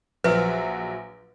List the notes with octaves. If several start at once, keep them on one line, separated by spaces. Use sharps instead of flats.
A#1 F3 F#3 F#4 B4 C5 E5